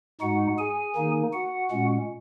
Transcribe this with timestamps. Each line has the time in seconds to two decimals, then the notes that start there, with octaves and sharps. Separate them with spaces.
0.21 G#2 G#3 D#4 F#4 F#5
0.59 G#4 G#5
0.95 D#3 A#3 D#4
1.33 F#4 F#5
1.71 A#2 G#3 C#4